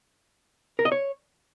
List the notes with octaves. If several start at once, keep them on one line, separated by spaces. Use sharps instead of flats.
A#4
D#5
C#5